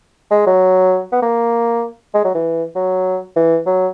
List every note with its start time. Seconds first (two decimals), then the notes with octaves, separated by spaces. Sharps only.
0.31 G#3
0.46 F#3
1.12 B3
1.22 A#3
2.14 G#3
2.24 F#3
2.35 E3
2.75 F#3
3.36 E3
3.66 F#3